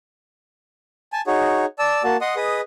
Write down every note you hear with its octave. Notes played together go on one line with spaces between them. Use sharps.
G#5 A5
D#4 F#4 G#4 C#5
D5 A5 E6
A#3 F#4 A5
D#5 F#5 C6 D#6
G#4 B4 D#5 D#6